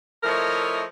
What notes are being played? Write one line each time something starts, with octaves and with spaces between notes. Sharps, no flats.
F3 A3 E4 A#4 C#5 D#5